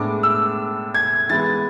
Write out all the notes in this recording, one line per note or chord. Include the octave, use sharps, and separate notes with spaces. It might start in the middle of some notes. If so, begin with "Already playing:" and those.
Already playing: A2 G#3 B3 D4 D6
E6
G#6
E3 G#3 B3 A6